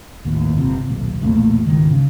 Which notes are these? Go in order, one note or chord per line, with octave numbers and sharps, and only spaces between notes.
A1 D#2
G1 C3
D#1 B1
B1 E2 A#2 A3
C#2 G#2 D#3
C#3